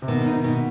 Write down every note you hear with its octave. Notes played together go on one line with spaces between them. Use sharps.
C3
B2 D#3
D#4
B2